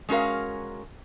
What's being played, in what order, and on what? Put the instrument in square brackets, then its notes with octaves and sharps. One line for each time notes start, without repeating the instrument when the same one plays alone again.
[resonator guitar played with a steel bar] G#3 C#4 F#4 A#4 F5